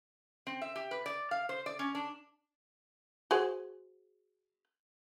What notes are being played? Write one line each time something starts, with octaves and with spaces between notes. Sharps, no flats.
C4
E5
G4
B4
D5
F5
C5
D5
C#4
D4
F#4 G#4 C5